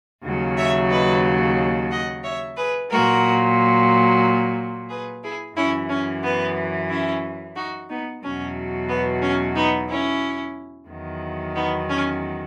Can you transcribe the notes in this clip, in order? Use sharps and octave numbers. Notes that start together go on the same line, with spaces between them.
D#2 C#3 F#3
C#5 E5
B4 D#5
D#5 F#5
C#5 E5
G#4 B4
A#2 F#3 F#4 A#4
G#4 B4
E4 G#4
F#2 E3 C#4 E4
C#4
B3
C#4 E4
D#4 F#4
B3 D#4
E2 B2 F#3 C#4
B3
C#4
B3 D#4
C#4 E4
E2 D#3 F#3
B3 D#4
C#4